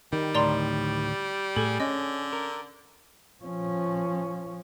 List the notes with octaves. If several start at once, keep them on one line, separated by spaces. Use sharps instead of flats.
D#3 G3
D2 A2 D5 A#5 C6
A2 G#4 A4
D3 C#4 D#5
A#4
F3 C#4